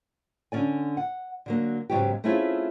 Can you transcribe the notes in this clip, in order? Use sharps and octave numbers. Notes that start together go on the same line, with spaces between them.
D3 C#4 D5 G#5
F#5
D3 F#3 A#3
G#2 C#3 F#3 B3 F#4 G4
A3 C4 C#4 E4 F4 G#4